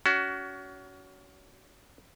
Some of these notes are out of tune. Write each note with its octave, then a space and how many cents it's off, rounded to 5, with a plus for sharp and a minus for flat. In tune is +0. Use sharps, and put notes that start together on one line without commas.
C#4 +30 F#4 +20